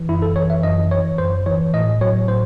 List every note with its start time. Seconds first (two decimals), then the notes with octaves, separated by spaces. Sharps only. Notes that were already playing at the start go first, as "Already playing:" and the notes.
Already playing: E3
0.08 F#2 E4
0.22 A4
0.36 E3 C#5
0.50 E5
0.63 F#2 D#5
0.91 E3 C#5
1.18 F#2 C5
1.46 E3 C#5
1.73 A2 D#5
2.01 F#3 C#5
2.28 A2 C5